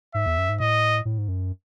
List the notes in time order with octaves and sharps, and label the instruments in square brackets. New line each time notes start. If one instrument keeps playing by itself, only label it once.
[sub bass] G#2 [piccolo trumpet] E5
[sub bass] E2
F#2
G#2
[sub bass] A2 [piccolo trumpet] D#5
[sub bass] A2
G#2
F#2